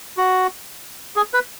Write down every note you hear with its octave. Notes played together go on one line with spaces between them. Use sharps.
F#4
G#4
B4